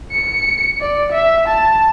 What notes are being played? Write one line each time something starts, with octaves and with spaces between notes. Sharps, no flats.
C#7
D5
E5
A5